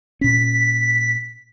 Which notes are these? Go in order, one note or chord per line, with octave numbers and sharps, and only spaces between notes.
A#2 C#4 B6